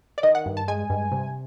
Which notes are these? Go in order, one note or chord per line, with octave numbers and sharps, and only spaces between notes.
D5
D#3 D#5
F#5
G2
A5
G#3 G#5
G2
C3